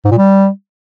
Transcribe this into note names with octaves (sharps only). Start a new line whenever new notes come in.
G#2
A#2
G3